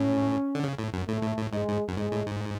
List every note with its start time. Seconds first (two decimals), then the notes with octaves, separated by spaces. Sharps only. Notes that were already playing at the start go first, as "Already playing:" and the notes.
Already playing: A2 C#4
0.55 D3
0.63 C#3
0.79 A2
0.93 F#2
1.08 A2 A3
1.22 A2
1.37 A2
1.52 G#2 G#3
1.68 G#2
1.88 F#2
1.97 G#2 G#3
2.12 A2
2.27 G#2